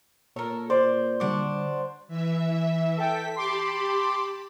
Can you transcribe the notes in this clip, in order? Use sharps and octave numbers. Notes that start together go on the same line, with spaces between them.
A#2 A4 A#4 C#5
C5 D5
D3 G3 D4 F#4 D6
E3 E5
A4 G5 B6
G4 A5 B5 C6 D6